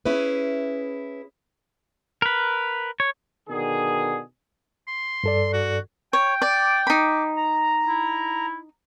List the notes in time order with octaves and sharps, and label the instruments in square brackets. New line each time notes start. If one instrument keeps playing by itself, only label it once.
[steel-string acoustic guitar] C#4 E4 G#4 B4
[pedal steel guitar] A#4 B4
C#5
[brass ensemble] B2 D3 D#3 G#4
[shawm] C6
[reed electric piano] G2 A4 D5
[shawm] F#4
[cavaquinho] C#5 [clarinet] G5
[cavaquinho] D5 [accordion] D6
[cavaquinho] D#4 B5
[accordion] A#5
[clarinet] E4